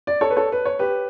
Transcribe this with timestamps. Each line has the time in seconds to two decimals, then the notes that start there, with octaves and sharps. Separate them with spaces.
0.07 D5
0.21 A4 C#5
0.31 B4
0.36 A4 C#5
0.52 B4
0.65 C#5
0.79 G4 B4